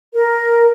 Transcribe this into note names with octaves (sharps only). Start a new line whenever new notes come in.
A#4